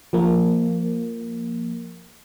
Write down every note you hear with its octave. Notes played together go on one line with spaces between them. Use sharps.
F3 A#3